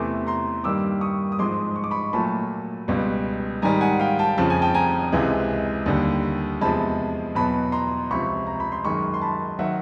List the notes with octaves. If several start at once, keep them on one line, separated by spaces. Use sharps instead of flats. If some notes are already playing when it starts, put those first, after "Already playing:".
Already playing: E2 C3 E3 A3 C6 D6
A#5 C6
G2 D#3 G3 A#3 D6 E6
C#6 D#6
D#6
G#2 F3 G#3 C6 D6
C#6
D6
B5 C#6
A#2 F#3 A3 A5 B5
C#2 B2 G3
G#2 D#3 G3 G#5 A#5
F#5 G#5
F5 G5
G5 A5
F2 C#3 F3 A5
G#5
G5 A5
G#5 A#5
C#2 C3 E3 G#3
D#2 D3 G3
E2 C3 F3 G#3 A5 B5
E2 B2 F#3 A5 B5
A#5 C6
C#2 C3 F3 B5 C#6
A#5
B5
C6
F#2 D#3 G#3 B5 C#6
C6
A5 B5
D#3 F#3 E5 F#5